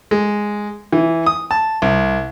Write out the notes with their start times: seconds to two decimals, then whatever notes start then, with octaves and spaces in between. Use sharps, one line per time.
0.11 G#3
0.93 E3
1.26 D#6
1.51 A5
1.82 C2